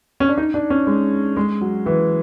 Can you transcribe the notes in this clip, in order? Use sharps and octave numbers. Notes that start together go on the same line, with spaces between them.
C#4
D4
D#4
D4
C#4
G#3
G#3
F#3
E3